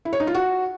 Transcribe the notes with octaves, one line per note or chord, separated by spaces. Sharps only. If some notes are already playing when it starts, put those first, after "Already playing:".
E4
C#5
D#4
F4
F#4